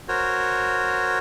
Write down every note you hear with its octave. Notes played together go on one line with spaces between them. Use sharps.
F#4 A#4 C5 C#5